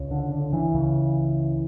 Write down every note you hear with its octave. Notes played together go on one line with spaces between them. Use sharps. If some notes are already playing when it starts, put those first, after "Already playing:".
Already playing: C#2 C#3
D3
D3
E3
C#2 C#3